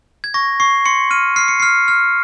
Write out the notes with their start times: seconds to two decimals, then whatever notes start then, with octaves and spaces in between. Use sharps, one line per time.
0.24 G#6
0.34 C#6 A#6
0.60 C#6 C7
0.86 C6 C#7
1.11 F6 D#7
1.36 F6 C7
1.48 C#7
1.60 F6 C7
1.88 F6